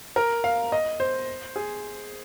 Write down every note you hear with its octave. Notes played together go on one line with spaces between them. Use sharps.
A#4
F5
D#5
C5
G#4